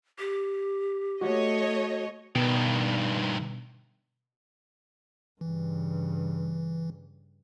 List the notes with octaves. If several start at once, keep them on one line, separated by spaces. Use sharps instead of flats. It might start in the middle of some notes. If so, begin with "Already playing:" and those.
G4
A3 F#4 C#5 D#5
G2 B2 D#3
G2 C#3 E3